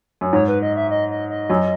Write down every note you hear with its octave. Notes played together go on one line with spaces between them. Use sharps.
F#2
G#2 C#5
B4
D#5
E5
D#5
D#5
D#5
F#2 F#3